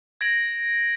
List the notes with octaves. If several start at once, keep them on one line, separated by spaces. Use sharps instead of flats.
G#6 A#6 D7 F#7